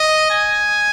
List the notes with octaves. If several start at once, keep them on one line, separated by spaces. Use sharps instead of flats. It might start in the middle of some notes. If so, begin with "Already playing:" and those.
Already playing: D#5
G#5